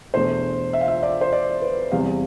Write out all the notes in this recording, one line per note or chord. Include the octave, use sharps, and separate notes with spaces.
E2 B2 A3 D4 C5
E5
F5
E5
D5
C5
D5
B4
E2 C3 G3 F5